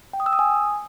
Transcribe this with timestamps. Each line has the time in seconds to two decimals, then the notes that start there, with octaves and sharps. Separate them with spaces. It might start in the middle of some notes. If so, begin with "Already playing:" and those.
0.13 G5
0.20 D#6
0.26 E6
0.33 D#6
0.39 G#5